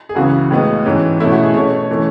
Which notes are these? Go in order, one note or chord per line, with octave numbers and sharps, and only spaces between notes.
G#4
C#2 C#3 E3 B3 F#4
A2 G#3 B3
G#2 E3 G#3 C#4
B2 A3 C#4 E4
F#4
G#4
B2 A3 C#4 C#5
E3 A3 C#4